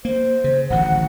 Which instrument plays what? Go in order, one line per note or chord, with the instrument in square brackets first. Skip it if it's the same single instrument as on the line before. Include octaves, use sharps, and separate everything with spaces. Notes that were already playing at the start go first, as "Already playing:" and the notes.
[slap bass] A#3 [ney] C5
[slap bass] C#3
[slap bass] D1 A1 D#3 [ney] F#5